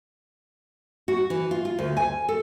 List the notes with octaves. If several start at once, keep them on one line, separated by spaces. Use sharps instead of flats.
F#4
E3
F4
F4
D2
G#5
A4